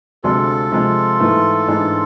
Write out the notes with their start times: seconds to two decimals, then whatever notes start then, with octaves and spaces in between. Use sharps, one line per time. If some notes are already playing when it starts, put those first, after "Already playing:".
0.23 D2 C3 G#3 D4 F4 A4
0.72 C3 F3 G#3
1.20 G#2 E3 A3
1.68 G#2 E3 G#3 D4